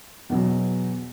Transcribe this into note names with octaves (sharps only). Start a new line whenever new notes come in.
E2 B2 F#3